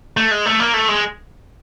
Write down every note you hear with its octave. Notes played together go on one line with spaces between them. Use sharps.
A3
G#3
A3
A#3
A3
G#3